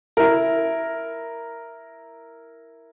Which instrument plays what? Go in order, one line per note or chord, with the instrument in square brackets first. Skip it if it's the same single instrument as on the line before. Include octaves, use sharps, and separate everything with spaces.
[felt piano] E4 A#4